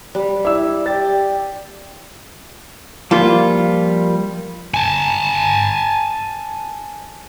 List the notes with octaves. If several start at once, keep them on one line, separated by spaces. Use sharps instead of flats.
G3
E4 D5 E6
G4 D5 A6
F3 G3 A#3 F4
G#5 A5